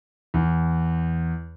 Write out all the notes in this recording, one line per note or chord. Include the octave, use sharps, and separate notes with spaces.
E2